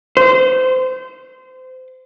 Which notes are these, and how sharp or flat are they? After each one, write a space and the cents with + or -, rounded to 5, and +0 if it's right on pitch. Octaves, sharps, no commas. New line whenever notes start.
C5 -25